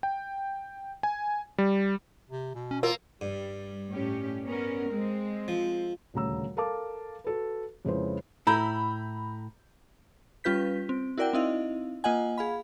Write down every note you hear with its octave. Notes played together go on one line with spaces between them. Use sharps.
G5
G#5
G3
C3
B2
C#4
A#3 F4 A#4
G2 G3
A2 C#4 G4
B3 C#4 A#4
G#3 C4
F3
D#1 D2 C#3 A#5 E6
A4 A#4 F5 A5 D6
F#4 A4 B4
F2 C#3 G#3 E4 B4 C5
A2 E4 A#5 B5 G6
G3 C#4 F4 B4 G6 B6
C4
E4 F#4 A#4 D5 F#5 G5
C4 D#4 E4 D#5 F5
A#3 F4 D#5 F#5 G#5
G#4 F5 B5